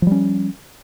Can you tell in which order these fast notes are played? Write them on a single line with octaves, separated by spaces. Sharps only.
F3 G3 C#4